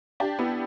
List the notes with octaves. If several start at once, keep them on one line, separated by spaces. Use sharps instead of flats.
D4 G4
B3 E4